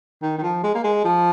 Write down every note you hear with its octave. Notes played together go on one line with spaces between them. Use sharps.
D#3
D#3
F3
G#3
A#3
G#3
F3